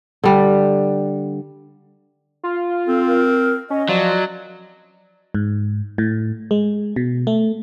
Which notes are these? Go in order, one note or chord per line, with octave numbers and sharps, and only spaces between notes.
D3 G3
F4
C4 A4
A#4
C#4 D#5
F3 F#3 D5
G#2
A2
G#3
B2
A3